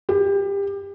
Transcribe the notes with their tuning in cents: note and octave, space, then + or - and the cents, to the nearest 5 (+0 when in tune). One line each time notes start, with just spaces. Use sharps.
G4 +25